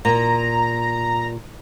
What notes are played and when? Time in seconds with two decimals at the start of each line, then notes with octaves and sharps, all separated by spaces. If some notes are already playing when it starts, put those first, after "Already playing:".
0.05 A#2 A#5